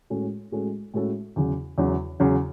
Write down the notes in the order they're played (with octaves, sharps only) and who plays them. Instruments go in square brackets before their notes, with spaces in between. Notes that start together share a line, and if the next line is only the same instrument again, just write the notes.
[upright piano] A2 G#3 C#4 F#4 A4
A2 G#3 C#4 F#4 A4
A2 G#3 C#4 F#4 A4
E2 C#3 F#3
E2 C#3 F#3
E2 C#3 F#3